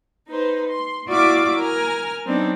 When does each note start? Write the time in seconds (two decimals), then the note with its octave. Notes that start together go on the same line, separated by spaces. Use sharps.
0.28 D#4 B4 C5
0.69 C6
1.08 E4 F#4 D5 E5 F5 D6
1.57 A#4 G#5 F6
2.24 F#3 B3 C4 D4 D#4